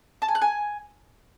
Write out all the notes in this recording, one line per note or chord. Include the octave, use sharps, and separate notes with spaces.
A5
G#5
F#6
G#5